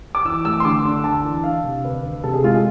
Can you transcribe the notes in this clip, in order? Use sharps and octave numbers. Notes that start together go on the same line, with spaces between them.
D6
E3 E6
A3 E6
C6
D3 D6
D4
D2 A5
E3
D4 F5
C3
D2 B4
D2
C3 A4
G#4
G#3 F4
G#4